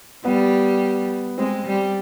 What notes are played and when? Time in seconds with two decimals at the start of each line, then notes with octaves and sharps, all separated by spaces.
0.25 G3 B3
1.38 G#3 C4
1.66 G3